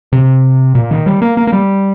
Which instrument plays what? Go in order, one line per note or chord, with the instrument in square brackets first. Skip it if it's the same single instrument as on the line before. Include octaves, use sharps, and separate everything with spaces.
[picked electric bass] C3
A#2
D#3
G3
A#3
A#3
A#3
G3